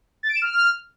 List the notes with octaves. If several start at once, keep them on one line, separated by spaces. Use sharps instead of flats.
A6
D7
E7
F6